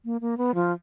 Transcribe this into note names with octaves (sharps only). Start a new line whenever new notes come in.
A#3
A#3
B3
F3